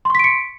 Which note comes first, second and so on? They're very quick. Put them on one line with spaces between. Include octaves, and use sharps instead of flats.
C6 C#6 B6 D7 C#7